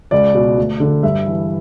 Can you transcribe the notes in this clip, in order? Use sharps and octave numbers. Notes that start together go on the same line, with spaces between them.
C#2 D5
B2
D2
D3
G2 E5
E3